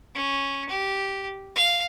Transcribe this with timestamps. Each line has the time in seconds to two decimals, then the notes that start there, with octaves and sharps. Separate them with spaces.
0.15 C#4
0.69 G4
1.56 F5